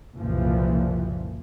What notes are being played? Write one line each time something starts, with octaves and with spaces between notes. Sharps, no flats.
F#1 C2 A#2 E3 F3